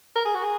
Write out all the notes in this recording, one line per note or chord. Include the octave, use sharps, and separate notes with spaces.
A#4
G#4
F#4
G#4